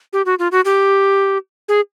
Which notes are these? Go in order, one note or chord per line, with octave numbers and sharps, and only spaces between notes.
G4
F#4
F4
F#4
G4
G#4